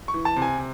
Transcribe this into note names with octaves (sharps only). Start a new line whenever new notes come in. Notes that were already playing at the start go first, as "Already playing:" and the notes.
C#6
E3
A5
C3
G#5
C3